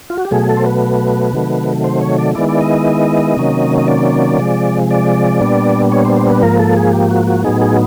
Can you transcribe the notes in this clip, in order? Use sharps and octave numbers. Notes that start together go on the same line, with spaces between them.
F4
F#4
G4
B2 F#3 A3 G#4
A4
C5
B4
C3 D#3 F#3 A3
C5
C#5
D5
D#3 G#3 B3 E4 D5
D5
D#5
C3 D#3 F#3 A#3 C#4
D#5
D5
C3 F3 G#3
D5
A#2 G3 B3 D4
C#5
C5
C5
B4
G#2 F3 A#3 A#4
A4
G#4
G4
F#4
F#4
A2 F#3 B3 D#4 G#4
G#4